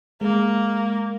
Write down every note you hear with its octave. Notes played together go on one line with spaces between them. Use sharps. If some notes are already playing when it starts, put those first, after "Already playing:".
G#3 A#3